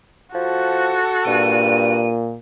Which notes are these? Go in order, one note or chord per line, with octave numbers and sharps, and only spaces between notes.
F3 F#4 A4
G2 A#2 D#7